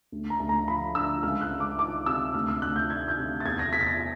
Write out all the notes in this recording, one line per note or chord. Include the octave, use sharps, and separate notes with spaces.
D2
A#5
D2
A#5
F3 B5
D3 E6
C#2 F6
F#6
C#2
D6
D#3 D6
C3 E6
D2 F6
E6
D2 F#6
G6
D#3 G#6
G6
C3
A6
E2 G#6
A#6
E2 B6
A6
A#6